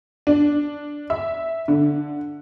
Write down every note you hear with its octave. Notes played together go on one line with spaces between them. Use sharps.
D4
E5
D3